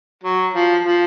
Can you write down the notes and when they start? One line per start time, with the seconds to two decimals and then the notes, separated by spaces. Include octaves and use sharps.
0.23 F#3
0.54 F3
0.85 F3